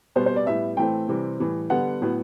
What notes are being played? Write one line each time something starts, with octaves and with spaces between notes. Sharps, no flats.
B2 G3 B3 C5
C5
D5
A2 G3 B3 E5
A2 E3 A3 C4 G5
C3 E3 G3 C4
A2 E3 G3
D3 G3 B3 F#5
A2 F#3 B3